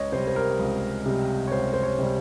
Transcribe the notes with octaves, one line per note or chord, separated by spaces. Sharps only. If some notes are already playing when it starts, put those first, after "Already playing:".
Already playing: C#2 C#5 D#5
C3 G3 C5
C5
A#4
C#2
C3 G3
C#5
C#2 C5
C5
C#5
C3 G3